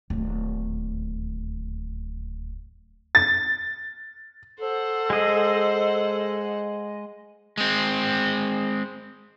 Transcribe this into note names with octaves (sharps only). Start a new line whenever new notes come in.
D1 D#2
A6
A4 C5 F#5
G#3 D#5
G#3 C4